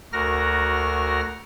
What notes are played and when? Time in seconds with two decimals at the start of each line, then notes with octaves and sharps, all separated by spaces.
0.13 D2 F#4 A#4 F6 A#6